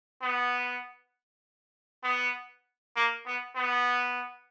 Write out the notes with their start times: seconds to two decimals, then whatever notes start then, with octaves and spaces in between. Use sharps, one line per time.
0.22 B3
2.04 B3
2.96 A#3
3.26 B3
3.56 B3